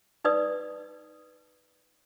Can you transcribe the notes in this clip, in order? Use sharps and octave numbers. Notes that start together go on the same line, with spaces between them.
D#4 B4 D5 D#6